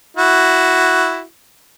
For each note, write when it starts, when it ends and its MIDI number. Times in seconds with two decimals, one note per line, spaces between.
0.17 1.23 64
0.17 1.23 66